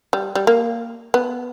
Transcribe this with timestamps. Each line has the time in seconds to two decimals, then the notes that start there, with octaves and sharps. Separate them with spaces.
0.13 G3
0.35 G3
0.47 A#3
1.14 B3